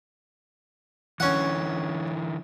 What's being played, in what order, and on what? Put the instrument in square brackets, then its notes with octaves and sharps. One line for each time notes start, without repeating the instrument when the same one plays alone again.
[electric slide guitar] D3 E3 [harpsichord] C#4 F#5